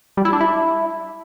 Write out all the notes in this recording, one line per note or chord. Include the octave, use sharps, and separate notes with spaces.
G3
E4
D4
E4